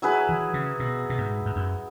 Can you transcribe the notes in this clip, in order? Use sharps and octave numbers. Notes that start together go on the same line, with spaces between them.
F#3 E4 G#4 B4
E3
C#3
B2
B2
G#2
G#2
F#2